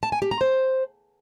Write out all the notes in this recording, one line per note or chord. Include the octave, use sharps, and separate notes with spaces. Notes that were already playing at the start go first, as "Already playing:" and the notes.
A5
G#5
G4
A#5
C5